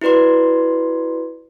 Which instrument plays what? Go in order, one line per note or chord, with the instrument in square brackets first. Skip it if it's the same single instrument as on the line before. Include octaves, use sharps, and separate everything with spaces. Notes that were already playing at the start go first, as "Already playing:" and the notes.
[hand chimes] E4 F#4 B4 D5 C6